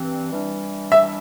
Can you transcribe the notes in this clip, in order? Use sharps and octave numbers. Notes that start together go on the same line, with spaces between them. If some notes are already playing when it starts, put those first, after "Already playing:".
Already playing: G2 E3 C4
E3 G3 D4
E5